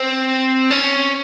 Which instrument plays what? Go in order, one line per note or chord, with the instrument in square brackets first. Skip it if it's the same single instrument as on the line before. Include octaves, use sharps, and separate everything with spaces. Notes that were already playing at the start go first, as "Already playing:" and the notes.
Already playing: [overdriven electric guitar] C4
C#4